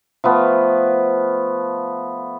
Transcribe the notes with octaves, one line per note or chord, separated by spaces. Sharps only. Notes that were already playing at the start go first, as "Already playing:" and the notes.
F3 A3 B3